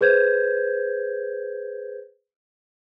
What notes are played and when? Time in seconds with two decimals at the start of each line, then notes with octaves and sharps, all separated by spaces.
0.01 G#4 B4 C5 G6 G#6